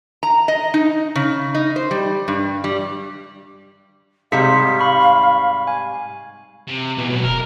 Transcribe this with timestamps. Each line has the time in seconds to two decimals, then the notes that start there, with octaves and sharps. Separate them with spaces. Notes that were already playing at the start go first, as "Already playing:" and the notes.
0.23 A#5
0.48 D#5
0.74 D#4
1.15 C#3
1.54 D#4
1.76 C5
1.91 G3
2.28 G2
2.64 G3
4.32 G#2 C3 G3 G#4 F5 B6 C#7
4.79 B5 C#6
5.67 G#5
6.68 C3
6.98 B2 E3 F#3
7.09 A2 F#3
7.24 D#1 A#4